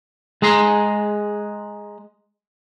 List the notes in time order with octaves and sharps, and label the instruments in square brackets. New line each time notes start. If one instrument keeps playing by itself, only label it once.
[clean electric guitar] G#3 G#4 A#5 C6